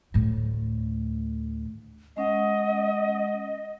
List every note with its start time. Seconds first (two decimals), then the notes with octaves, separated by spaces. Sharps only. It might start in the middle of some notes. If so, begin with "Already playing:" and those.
0.14 D2 A2
2.17 G#3 C#4 D#5 F#5